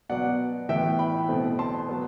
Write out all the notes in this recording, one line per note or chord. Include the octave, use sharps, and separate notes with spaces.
B2 F#3 B3 D5 F#5
A2 E3 B3 E5 G5
G5 B5
B2 A3 C4
A5 C6
F#3 B3